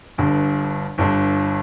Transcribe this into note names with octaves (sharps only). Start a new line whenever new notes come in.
G1 G2 D3
G1 G2 D3